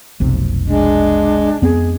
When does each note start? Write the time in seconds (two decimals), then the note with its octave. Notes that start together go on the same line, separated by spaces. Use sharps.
0.20 F1 B1 C3
0.68 G#3 D4
1.62 F2 B3 C4 G#4